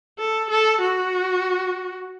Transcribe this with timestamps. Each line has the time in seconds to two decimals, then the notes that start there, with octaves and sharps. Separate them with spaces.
0.19 A4
0.50 A4
0.81 F#4